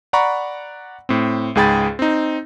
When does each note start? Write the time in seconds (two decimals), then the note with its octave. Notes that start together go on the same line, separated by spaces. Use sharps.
0.13 D5 F#5 A#5 B5 C#6
1.09 A2 C4
1.55 C#2 G#2 G#4 G5 B5 A6
1.99 C4 D#4